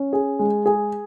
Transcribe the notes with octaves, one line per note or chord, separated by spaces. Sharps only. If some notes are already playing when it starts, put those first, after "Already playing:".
Already playing: C#4
G#4
G#3
G#4